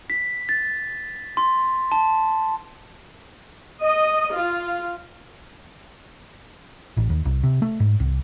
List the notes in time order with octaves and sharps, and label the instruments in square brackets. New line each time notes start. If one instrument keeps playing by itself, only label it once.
[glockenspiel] B6
A6
C6
A5
[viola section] D#5
F4
[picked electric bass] A1
D#2
C2
C3
A3
G#2
C2